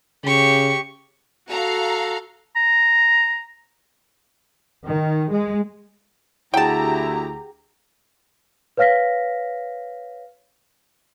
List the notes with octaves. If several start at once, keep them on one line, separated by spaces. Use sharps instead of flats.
C#3 G4 C#6
F#4 A4 F5 A#5
A#5
D#3
G#3
D2 E4 G4 G#4 F#5 G5 A5 A#5
B4 C#5 F5 F6 A#6 B6